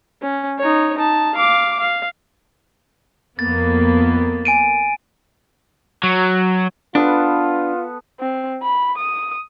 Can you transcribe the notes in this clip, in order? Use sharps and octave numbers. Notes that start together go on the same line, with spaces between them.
C#4
D#4 C#5
D#4 A5
F5 D6
F5
F2 A#3 B3 A6
G#5 D7 D#7
F#3
B3 D4 F4 A4 B4
C4
B5
D#6